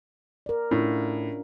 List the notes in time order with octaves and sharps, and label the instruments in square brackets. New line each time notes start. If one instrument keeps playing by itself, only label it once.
[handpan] A#4 D5
[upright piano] A2 [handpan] C#4 D4 F4